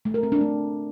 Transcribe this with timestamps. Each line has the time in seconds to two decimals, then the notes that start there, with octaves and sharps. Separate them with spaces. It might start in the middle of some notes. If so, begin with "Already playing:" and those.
0.05 A3
0.14 A#4
0.23 C4
0.32 D4
0.41 A3